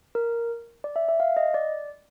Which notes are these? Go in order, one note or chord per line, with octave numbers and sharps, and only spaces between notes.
A#4
D5
E5
E5
F5
D#5
D5